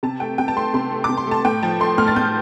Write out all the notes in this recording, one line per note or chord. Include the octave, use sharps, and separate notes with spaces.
C3 A5
A3 G5
C3 G5
A5
A3 C6
C3 C6
A3
C3 D6
C6
A3 A5
A2 G5
F3 A5
A3 C6
A2 F6
A6
A2 G6